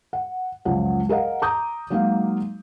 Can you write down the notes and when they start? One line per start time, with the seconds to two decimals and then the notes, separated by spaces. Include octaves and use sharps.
0.13 F#5
0.65 C#2 F#2 F3 F#5
1.09 G#4 A#4 D#5 F5 F#5
1.42 A#5 D6 D#6 G6
1.90 F#3 G#3 A#3 D#4 F#4 F5